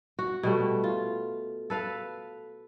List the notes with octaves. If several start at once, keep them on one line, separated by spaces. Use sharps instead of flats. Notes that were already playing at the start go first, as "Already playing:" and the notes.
F#4
B2 G3 A3
F4
A4 B4 F5